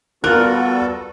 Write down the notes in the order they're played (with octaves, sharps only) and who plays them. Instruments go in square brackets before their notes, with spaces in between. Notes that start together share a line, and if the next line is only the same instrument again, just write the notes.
[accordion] G3 F#4 A4 [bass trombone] B3 [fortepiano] F4 F#6 [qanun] A#4